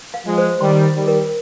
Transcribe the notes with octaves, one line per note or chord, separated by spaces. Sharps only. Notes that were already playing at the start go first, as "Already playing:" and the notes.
F5
F3 G#3
C5
D#3 G3 C6
D#5
D#3 G3
A#4